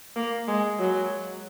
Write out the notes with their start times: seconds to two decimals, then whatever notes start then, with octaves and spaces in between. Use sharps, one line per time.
0.16 A#3
0.48 G#3
0.79 F#3